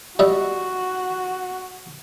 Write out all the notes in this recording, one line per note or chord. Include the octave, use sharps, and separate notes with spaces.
G3 F#4 D#5 E5